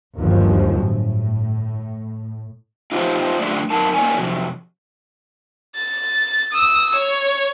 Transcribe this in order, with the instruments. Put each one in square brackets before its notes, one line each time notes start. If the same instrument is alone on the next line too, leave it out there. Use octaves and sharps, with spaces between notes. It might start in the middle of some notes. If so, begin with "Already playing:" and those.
[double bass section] G1 D#2 F3 F#3
A2
[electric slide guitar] D#4 F4 G4 C5
F#2 A3 D4 F4 G4 D5
F#2 D#4 A#4 A5
A#3 D#4 C#5 D5 G#5
F2 G#2 C3 F#3
[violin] A6
D#6 E6
C#5